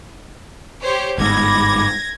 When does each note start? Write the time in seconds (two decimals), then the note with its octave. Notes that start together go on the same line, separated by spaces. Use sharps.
0.82 G4 C5 C#5
1.18 G1 G#2 B5 D6 G#6 A#6